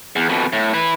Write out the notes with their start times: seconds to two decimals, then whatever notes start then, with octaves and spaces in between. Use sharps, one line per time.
0.16 E2
0.29 F2 B2
0.53 A2
0.74 E4 B4